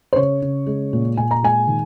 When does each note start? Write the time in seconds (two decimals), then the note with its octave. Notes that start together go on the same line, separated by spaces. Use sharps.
0.13 C5
0.16 C#3 C#5
0.42 C#3
0.67 G#3
0.93 A#2
1.17 A#2 G#5
1.31 A#5
1.43 G#3 G#5
1.67 D#3